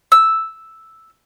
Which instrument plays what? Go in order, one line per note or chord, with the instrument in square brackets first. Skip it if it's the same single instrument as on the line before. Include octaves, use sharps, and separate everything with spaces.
[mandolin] E6